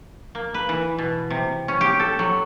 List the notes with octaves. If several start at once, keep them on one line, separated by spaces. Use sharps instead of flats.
A#3
B4
E3
B2
C3
C#4
G4
A4
F#3